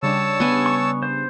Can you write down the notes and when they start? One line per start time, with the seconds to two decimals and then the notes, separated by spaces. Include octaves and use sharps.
0.03 C#3 G3 D4 C#5 A5 E6
0.40 B3 G#5
0.66 C#6
1.03 C5